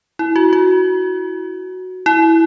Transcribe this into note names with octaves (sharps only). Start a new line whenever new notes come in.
E4
F#4
F#4
E4